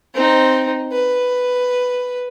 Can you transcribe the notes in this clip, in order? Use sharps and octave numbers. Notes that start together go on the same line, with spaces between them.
C4 D#4
B4